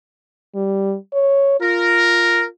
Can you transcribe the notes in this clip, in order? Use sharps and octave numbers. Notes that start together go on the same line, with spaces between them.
G3
C#5
F4 A#4